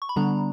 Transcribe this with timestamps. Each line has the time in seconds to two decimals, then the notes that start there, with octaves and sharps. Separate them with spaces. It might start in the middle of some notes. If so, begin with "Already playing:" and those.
0.02 C#6
0.09 B5
0.16 D3 G3 B3 D4 A#5